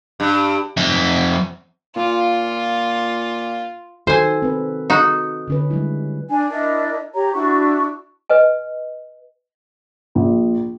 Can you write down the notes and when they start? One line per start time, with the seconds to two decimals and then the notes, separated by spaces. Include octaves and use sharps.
0.20 G2
0.77 F2 E5
1.96 A#2 F4
4.07 D#3 F#4 A4 C5 G#5
4.42 C4 B4
4.90 D#4 F#4
5.48 D3 C#4 B4
5.70 G3 G#3 E4
6.29 D4 G#5
6.49 D4 E4 A#4 D#5
7.15 G4 C#5 A#5
7.34 D4 E4 F#4 C#6
8.30 B4 D#5 G#5
10.15 A#1